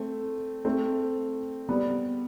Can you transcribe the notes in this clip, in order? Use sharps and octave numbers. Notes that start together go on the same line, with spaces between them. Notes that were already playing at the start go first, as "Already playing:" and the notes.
Already playing: A3 C4
A3 C4
G3 B3